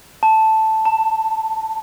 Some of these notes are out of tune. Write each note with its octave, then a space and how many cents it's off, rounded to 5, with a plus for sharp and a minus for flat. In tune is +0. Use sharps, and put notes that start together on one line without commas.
A5 +0
A5 +30